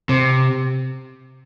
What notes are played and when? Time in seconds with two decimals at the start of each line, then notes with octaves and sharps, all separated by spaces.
0.09 C3